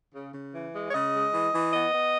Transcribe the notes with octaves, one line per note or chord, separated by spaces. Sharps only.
C#3
C#3
E3
G#3
C#5
C#3 D#5
G#3
E3
E3
B3 D#5
B3